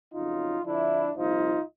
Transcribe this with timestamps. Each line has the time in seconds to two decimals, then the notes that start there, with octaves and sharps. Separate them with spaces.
0.13 F2 C#3 F#3 D#4 F4
0.64 F2 D3 F3 D4 E4
1.15 C2 A#2 F3 D#4 F4